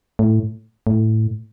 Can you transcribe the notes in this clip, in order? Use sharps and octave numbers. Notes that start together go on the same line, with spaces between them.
A2
A2